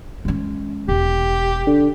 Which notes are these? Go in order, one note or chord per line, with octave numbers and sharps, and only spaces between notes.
G#3 C#4
E1 G4
D3